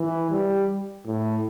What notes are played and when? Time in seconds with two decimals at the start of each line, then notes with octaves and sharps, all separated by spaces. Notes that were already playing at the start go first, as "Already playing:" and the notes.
Already playing: E3
0.31 G3
1.05 A2